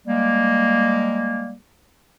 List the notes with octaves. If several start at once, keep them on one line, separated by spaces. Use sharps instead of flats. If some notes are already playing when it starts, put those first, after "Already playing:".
G3 G#3 A#3